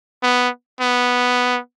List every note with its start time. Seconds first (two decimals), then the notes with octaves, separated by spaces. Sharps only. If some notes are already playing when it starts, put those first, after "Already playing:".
0.23 B3
0.81 B3